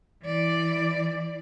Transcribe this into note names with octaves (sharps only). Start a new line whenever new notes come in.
E3 D5